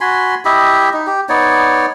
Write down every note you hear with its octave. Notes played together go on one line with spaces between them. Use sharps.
F#4 G#5 B5 C6
E4 G4 D#5 E5
D#4
G4
B3 D#4 C#5 D5